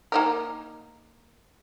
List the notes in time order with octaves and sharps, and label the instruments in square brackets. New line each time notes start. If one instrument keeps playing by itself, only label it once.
[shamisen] A#3 D#4 A#4